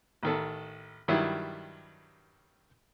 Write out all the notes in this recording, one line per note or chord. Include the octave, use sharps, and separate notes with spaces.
A1 D#3 A4
G2 D#3 F#3 G3 E4